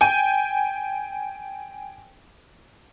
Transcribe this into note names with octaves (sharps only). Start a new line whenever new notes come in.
G5 G#5 D#7